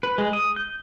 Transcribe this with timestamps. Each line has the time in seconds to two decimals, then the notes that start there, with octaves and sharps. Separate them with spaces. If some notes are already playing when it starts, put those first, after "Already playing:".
0.03 B4
0.18 G#3
0.33 D#6
0.56 G6